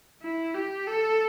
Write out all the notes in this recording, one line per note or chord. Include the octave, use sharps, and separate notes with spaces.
E4
G4
A4